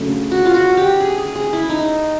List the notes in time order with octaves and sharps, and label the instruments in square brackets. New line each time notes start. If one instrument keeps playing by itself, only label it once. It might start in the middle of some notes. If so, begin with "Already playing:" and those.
Already playing: [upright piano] C#3 F#3 A3 D4
[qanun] F#4
F4
F#4
G4
G#4
G#4
G#4
E4
D#4